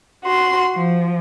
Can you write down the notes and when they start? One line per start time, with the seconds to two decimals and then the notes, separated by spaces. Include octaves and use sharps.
0.24 F#4 C6
0.75 F3